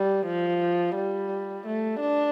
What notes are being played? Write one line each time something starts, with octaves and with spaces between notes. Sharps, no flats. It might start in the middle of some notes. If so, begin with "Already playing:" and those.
Already playing: G3
F3
G3
A3
D4